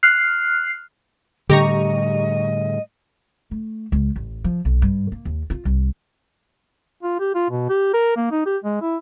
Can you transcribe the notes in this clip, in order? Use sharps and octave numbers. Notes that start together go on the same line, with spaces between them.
F6 F#6 C7
A2 D3 G3 G4 D#5 A#5 C#6
A3
C#2
A1
F3
B1
G2
A#3
D#2
F4
C2
F4
G4
F4
B2
G4
A#4
A#3
D#4
G4
G#3
E4